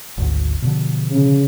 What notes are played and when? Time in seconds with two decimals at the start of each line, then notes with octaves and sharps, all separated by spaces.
0.17 G#1 D2
0.62 B2 D3 F3
1.10 C#3